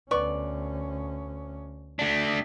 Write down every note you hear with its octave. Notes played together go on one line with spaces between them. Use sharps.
D2 B3 C#4 D5 C#6
A3 D4